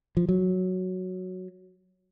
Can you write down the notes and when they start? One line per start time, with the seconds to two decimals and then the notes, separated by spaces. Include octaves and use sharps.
0.17 F3
0.29 F#3